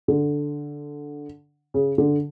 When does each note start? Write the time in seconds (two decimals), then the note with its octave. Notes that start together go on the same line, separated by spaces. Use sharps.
0.08 D3
1.74 C#3
1.98 D3